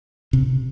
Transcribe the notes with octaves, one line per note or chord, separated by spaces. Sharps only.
C3